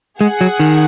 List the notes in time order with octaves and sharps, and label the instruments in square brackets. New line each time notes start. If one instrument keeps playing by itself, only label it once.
[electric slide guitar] G#3 [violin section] G#4 F#5
[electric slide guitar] F#3
D#3